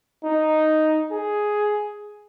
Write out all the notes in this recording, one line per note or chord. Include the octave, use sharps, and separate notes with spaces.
D#4
G#4